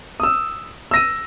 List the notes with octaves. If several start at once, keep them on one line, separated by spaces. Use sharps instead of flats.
D#6 E6
E6 A#6 D#7